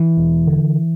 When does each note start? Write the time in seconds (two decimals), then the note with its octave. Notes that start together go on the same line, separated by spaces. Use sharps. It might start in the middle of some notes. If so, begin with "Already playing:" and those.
Already playing: E3
0.17 E1
0.47 D3